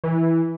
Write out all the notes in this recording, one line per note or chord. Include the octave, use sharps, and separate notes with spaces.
E3